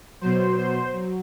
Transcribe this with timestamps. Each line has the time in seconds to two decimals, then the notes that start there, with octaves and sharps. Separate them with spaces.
0.21 B2 F#3 C5
0.57 C5
0.92 F#3